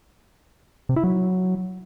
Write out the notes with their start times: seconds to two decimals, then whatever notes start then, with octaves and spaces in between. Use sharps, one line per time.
0.89 C3
0.96 E4
1.04 F#3